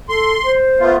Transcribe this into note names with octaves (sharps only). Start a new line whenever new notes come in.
A4 C6
C5
A3 B3 F4